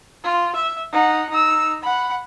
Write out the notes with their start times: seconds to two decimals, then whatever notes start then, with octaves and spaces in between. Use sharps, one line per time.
0.24 F4
0.55 E5
0.92 D#4 F#5
1.30 D#4 E6
1.83 F#5 B5